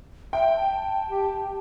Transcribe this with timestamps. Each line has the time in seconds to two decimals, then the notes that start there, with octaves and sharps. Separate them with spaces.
0.33 E5 G5
0.57 A5
1.10 G4